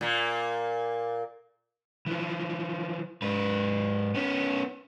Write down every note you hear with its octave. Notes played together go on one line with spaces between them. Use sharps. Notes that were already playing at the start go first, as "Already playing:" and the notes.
A#2 A#3
E3 F3
G#2 B4
B3 C#4